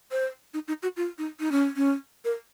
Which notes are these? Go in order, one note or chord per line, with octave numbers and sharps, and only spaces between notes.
C5
D#4
D#4
F#4
F4
D#4
D#4
C#4
C#4
A#4